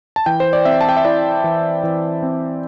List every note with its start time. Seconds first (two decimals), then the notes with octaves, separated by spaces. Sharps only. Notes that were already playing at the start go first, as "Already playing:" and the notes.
0.16 A5
0.26 E3 G5
0.40 C5
0.53 D5
0.65 C4 E5
0.81 A5
0.89 G5
0.97 E5
1.05 E4 D5
1.44 E3
1.83 E3
2.23 C4